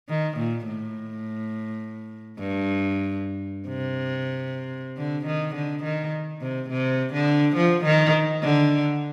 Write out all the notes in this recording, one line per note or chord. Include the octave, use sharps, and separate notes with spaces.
D#3
A#2
A2
G2
C3
D3
D#3
D3
D#3
C3
C3
D3
F3
D#3
D3